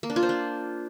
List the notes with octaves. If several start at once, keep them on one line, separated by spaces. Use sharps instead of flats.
A#3
D4
F4
C5
D4